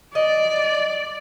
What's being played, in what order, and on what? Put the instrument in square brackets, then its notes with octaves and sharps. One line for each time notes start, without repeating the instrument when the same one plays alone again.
[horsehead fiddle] D5 [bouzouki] D#5